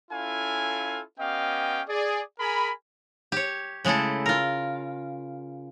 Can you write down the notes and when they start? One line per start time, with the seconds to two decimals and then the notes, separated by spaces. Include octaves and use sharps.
0.11 C#4 E4 F4 A4 F5 G#5
1.19 B3 C#4 G4 D#5 F5 G5
1.89 G#4 D5
2.39 G#4 A#4 G#5 B5
3.32 G4 C#5
3.85 C#3 G#3 A3 E4 A4
4.26 F4 A#4